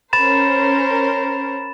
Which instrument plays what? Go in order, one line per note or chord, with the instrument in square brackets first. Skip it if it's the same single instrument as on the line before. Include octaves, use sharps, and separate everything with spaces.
[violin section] C#4 A#4 C5 [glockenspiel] B5 A6 E7